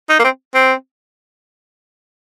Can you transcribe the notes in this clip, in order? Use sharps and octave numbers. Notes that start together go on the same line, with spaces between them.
D#4
A#3
C4
C4